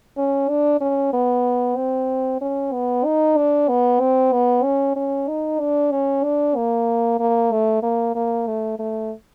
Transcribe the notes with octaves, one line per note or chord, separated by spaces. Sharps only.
C#4
D4
C#4
B3
C4
C#4
B3
D#4
D4
B3
C4
B3
C#4
C#4
D#4
D4
C#4
D4
A#3
A#3
A3
A#3
A#3
A3
A3